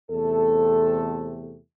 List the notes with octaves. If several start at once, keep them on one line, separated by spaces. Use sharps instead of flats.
E2 C3 A3 C4 A4